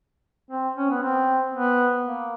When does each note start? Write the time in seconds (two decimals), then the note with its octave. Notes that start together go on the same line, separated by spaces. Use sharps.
0.51 C4
0.77 C#4
0.90 B3
1.02 C4
1.54 B3
2.05 A#3